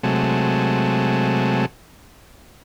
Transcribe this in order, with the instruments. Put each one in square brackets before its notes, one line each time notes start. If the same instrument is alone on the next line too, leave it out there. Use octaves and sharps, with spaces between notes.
[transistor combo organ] C3 F#3 G#3 A3